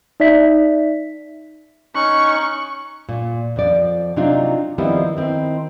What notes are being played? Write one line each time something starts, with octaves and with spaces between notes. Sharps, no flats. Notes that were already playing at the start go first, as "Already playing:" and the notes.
D#4 D5 E5 B6
C#4 D#4 C#6 F#6
A#2
F2 F3 D5
C3 F#3 D4 D#4 F4
D#3 F3 G3 B3 C4 E4
D#3 C4 E4